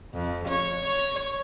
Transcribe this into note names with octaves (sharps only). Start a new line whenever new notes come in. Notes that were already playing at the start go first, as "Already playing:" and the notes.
F2
C#5
C#5